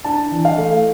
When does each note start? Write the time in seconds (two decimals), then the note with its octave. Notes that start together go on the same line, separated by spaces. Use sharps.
0.04 D4 A5
0.31 E3
0.45 F5
0.58 A3